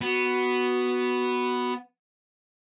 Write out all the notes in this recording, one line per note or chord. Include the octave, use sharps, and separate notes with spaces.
B3 F#4